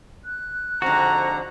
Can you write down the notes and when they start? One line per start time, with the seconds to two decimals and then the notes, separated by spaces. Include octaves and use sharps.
0.25 F#6
0.82 F2 G#2 D3 F#4 A#5